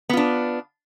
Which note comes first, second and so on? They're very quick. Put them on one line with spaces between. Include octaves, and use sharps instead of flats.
B3 F4 D4